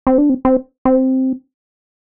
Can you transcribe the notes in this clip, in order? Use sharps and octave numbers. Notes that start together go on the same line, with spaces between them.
C4
D4
C4
C4
C4